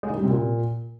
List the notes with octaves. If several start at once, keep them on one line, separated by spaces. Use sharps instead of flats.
G#3
D#3
G3
C3
A#2